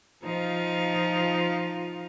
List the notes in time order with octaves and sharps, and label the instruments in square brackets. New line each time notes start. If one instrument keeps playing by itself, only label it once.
[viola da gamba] F3 D#4 F4